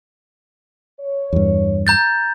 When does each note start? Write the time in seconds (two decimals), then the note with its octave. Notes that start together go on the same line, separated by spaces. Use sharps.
1.00 C#5
1.33 E2 G2
1.87 A#5 G6 A6